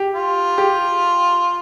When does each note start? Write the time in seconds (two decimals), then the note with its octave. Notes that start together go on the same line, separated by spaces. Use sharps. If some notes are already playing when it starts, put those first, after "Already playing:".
Already playing: G4
0.14 F4
0.58 G4